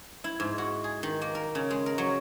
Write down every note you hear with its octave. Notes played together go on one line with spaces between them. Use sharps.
E4
G#2
F#4
G#4
D#3
A#3
A#4
C#3
G#3
A#4
F#3